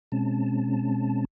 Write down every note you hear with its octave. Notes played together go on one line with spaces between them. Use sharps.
B2 G#3 C4 C#4 A5